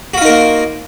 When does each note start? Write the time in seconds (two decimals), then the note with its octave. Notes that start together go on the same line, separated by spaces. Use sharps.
0.14 F#4
0.17 F4
0.21 D#4
0.25 A#4
0.29 A#3